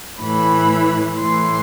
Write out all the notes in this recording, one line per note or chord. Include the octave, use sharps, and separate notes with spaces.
A2 E3 B5
A2 E3 C6